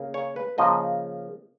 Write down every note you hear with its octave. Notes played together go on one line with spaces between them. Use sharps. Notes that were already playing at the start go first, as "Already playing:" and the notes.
Already playing: C#3 A#3
C#5
B4
C#3 F3 A#3 D#5